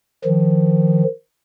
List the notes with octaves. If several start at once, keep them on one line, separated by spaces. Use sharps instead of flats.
D#3 F3